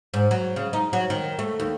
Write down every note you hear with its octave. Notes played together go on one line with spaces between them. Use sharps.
G#2
F#3
C#3
D#4
F#3
D#3
A3
D#2